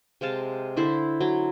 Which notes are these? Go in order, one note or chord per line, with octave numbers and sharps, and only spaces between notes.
C3 G#3 F5 A5
D3 E4 C5
F#3